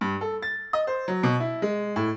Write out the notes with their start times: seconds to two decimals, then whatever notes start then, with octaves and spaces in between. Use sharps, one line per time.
0.01 G2
0.21 A4
0.42 A6
0.73 D#5
0.87 C5
1.08 F#3
1.23 B2
1.40 E4
1.62 G#3
1.96 A2